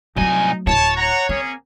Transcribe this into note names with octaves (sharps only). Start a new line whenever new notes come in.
C2 F#3 A3 D#4 G#5
D1 E4 C#5 A5
F#5 A#5
A#3 C4 C#4 G#4